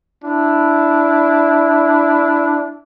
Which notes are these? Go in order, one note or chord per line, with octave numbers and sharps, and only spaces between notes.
D4 E4